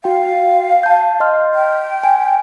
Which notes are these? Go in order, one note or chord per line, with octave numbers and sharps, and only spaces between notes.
F#4 F5 G5
A5 G6
D#5 C6 F6
G5
G#5